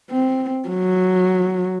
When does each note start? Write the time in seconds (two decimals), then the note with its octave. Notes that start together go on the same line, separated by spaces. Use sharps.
0.10 C4
0.69 F#3